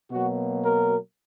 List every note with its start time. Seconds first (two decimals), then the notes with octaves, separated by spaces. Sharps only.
0.11 B2 F#3 A#3 F#4
0.64 A#4